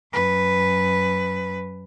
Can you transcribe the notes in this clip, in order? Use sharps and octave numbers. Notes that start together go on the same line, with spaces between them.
F#2 B4